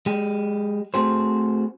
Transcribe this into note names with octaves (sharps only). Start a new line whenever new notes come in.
G#3 G4
A3 C4 F#4 G#4 C5